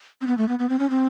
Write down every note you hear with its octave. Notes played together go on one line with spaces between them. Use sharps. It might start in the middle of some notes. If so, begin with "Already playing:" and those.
C4
B3
A3
B3
B3
C4
C#4
C4